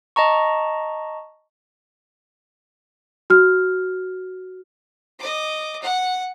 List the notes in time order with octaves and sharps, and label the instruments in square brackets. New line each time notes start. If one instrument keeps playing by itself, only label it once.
[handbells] D#5 A5 A#5 C#6
[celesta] F#4 F6
[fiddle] D#5 D6
F#5